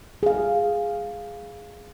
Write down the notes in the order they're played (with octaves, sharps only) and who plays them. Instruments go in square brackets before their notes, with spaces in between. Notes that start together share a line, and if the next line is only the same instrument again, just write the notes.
[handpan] G#4 F5